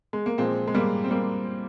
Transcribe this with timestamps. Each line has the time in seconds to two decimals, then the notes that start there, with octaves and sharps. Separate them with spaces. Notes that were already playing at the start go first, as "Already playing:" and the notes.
0.13 G#3
0.26 A#3
0.38 A#2 F3 G#3 C4
0.68 G#3
0.74 G3 A#3
1.04 C4
1.11 G3 A#3